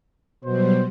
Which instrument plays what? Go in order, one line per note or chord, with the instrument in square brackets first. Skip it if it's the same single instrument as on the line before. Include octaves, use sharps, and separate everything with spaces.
[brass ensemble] B2 C5 [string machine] F#3 G3